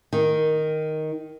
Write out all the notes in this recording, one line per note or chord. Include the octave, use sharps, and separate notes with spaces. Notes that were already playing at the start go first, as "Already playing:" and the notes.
D#3